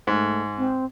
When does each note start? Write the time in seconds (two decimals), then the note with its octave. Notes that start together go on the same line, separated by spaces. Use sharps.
0.07 G#2 A3
0.58 C4